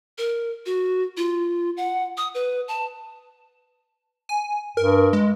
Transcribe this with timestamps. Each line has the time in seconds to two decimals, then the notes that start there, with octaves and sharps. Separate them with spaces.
0.18 A#4
0.66 F#4
1.17 F4
1.77 F#5
2.17 D#6
2.35 B4
2.68 A5
4.29 G#5
4.77 G2 A#4
5.13 G#3